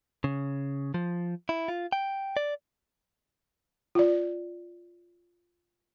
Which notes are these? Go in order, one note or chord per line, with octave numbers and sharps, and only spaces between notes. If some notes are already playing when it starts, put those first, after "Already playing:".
C#3
F3
E4
F4
G5
D5
F4 D5